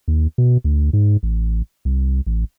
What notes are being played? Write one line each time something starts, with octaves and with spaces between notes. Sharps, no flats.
D#2
B2
D2
G#2
A1
C2
A1